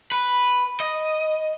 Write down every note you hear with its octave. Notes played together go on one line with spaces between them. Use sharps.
B4
D#5